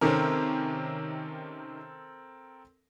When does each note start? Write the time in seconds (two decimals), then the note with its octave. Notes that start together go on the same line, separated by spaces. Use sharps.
0.01 C3 D#3 C4 C#4 A4 A#4